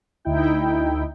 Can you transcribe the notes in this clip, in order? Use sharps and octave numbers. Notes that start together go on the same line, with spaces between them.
D2 D#4 E4 G5